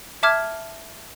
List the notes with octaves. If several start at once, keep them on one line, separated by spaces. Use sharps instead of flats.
E5 A5 D6 F6 G#6